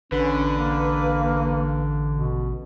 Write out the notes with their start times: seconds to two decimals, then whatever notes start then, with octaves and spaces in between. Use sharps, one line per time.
0.12 A1 D3 C#4 B4
0.55 A#3
2.12 B2